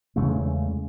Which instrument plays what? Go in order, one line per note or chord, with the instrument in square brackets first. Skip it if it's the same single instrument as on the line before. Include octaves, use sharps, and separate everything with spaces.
[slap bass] E2 C#3 G#3 A3